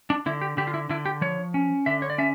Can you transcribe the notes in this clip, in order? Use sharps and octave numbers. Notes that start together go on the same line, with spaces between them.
D4
D3 E4
G4
D3 G4
F4
E4
D3 E4
G4
F3 C#5
C#4
D3 E5
C#5
D5
C#4 E5